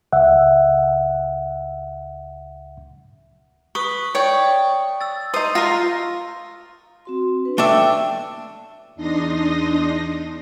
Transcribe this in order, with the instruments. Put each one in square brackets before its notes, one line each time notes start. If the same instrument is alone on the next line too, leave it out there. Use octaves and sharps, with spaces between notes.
[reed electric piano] C#2 E5 F#5
[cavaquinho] B4 [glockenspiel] C#6 D#6
[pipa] C#5 [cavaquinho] D5 G5
[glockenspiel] E6 A6
[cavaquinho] D#4 D#6 [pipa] C5
[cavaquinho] F4 A#4 [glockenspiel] A#6
[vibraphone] C4 F#4 C6
D4 B4
[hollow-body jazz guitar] A3 D4 E5 [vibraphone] G5
[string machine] E2 D4 D#4 C6 D#6 A#6